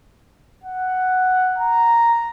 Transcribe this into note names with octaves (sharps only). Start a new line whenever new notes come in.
F#5
A#5